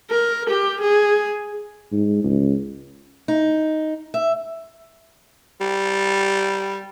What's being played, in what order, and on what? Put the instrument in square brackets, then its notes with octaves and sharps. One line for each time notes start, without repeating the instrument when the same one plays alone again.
[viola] A#4
G4
G#4
[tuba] G#2
C#2
[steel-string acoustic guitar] D#4
E5
[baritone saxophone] G3